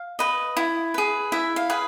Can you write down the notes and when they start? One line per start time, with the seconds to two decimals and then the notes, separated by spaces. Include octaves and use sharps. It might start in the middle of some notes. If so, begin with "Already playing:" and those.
Already playing: F5
0.19 B4 D#5
0.57 E4
0.94 G#4 B4
1.32 E4 E5
1.56 F5
1.70 G#4 B4